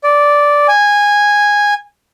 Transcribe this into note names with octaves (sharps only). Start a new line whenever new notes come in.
D5
G#5